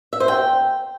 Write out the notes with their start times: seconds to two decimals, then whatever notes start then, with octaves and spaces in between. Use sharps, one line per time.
0.13 E5
0.20 C5
0.28 G5